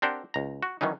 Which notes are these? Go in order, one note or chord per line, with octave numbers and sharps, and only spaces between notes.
C4 D4 G4 A#4 C5 F#5
C#2 A#5
F#4
D#3 E3 F#3 C#4 D#4